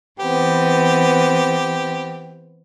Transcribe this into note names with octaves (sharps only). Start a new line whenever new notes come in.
E3 B3 C4 G4